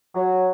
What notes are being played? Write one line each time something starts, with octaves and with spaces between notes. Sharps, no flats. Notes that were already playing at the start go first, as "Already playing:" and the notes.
F#3